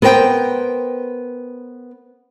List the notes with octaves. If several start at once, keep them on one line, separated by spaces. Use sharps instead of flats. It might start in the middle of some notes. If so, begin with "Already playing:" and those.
B3 A#4 C5 D#5 G5